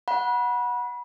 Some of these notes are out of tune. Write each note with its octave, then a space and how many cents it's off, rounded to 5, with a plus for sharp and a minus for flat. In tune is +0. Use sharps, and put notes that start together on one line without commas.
F#5 -15 B5 -30